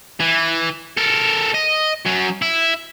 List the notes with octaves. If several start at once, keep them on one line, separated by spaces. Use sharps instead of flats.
E3
A4 A#4
D#5
F#3 C#4
E4